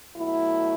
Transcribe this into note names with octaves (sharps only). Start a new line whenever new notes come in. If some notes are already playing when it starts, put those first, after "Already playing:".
B2 F#3 A3 E4